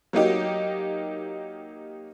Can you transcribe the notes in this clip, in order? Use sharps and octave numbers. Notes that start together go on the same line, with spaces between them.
F#3 A#3 D#4 G4